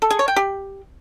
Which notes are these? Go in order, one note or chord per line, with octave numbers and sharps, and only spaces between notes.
A4
G#4
C#5
G5
G4